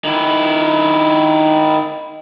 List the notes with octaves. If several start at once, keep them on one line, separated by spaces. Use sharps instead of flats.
D#3 E4